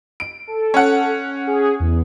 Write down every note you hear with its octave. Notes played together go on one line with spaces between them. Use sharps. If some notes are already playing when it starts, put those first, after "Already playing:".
D7
A4
C#4 F#5
G#4
E2